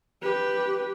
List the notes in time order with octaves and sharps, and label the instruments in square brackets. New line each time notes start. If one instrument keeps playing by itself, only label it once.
[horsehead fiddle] G4 B4